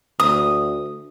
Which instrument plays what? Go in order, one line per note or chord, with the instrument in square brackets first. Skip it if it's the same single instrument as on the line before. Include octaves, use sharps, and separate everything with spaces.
[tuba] D2 [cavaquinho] D#6